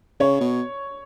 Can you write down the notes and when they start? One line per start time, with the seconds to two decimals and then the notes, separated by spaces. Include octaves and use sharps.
0.20 C#3 C#5
0.41 B2